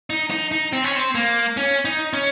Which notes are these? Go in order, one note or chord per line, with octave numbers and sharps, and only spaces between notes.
D#4
D#4
D#4
C4
C#4
C4
A#3
C#4
D#4
C#4